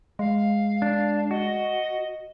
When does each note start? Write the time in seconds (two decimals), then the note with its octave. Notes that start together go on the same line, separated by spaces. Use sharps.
0.19 G#3 F5
0.82 D4
1.31 F#4 D#5